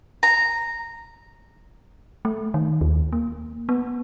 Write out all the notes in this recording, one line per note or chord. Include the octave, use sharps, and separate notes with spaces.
A#5
A3
D#3
D#2
A#3
B3